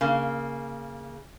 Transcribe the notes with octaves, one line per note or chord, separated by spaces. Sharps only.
C#3 A#3